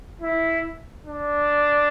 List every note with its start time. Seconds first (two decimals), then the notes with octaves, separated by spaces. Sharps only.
0.22 E4
1.06 D4